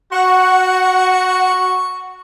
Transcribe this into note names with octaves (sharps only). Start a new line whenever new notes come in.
F#4 F#5 C#6 F#6